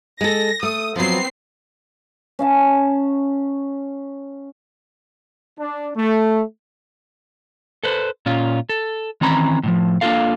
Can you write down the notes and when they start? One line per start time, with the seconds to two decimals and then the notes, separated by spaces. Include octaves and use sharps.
0.21 G#3 A4 A#6
0.63 A3 D#6
0.96 F3 F#3 B3 C4 C7
2.39 C#4 F5 A5
5.59 D4
5.96 A3
7.84 A4 B4 C5
8.26 A#2 C#4 F4
8.69 A4
9.21 D#3 E3 C4 C#4 A#5 B5
9.63 A2 D#3 F3
10.01 A#3 D4 D#4 F4 A4 F5